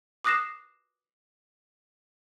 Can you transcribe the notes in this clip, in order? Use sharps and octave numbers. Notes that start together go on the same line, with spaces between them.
D6 D#6 F#6 A#6 C7 E7